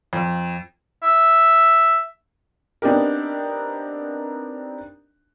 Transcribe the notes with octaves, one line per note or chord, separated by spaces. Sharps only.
F2
E5
B3 C4 D4 D#4 G4 A#4